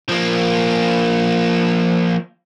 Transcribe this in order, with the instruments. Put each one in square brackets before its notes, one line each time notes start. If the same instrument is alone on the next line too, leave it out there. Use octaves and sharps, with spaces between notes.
[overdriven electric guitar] F3 A#3